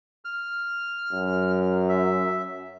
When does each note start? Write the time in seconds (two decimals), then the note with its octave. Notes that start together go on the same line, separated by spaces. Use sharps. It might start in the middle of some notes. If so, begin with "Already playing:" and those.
0.25 F6
1.13 F#2
1.89 E5